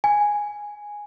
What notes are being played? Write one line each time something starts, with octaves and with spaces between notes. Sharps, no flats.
G#5